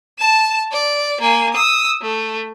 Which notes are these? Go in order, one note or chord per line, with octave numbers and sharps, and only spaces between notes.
A5 E7
D5
A#3 G#5
D#6 E6
A3